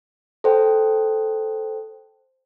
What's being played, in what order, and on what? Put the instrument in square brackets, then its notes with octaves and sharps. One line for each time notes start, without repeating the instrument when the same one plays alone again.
[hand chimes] A4 C5 G5